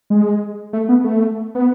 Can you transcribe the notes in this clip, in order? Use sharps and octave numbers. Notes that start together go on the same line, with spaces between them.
G#3
A3
B3
A3
B3